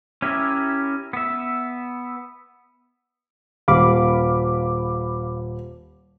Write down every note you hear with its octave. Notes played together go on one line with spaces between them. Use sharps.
C#4 E4 G4 A#4 E5
B3 E5
D#1 F5 B5 D6